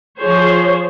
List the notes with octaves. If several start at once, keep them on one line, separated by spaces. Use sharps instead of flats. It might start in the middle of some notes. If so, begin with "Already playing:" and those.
F3 G#4 C5 C#5